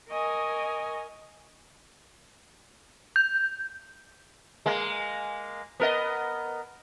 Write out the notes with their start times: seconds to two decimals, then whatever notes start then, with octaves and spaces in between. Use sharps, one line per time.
0.10 A#4 D#5 G#5 C#6 D#6
3.16 G6
4.66 G#3 A#3
5.80 B3 A#4 D#5